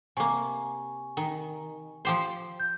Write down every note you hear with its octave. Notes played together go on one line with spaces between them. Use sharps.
C3 A#3 G#5 C#6
D#3
F3 G4 C5
G6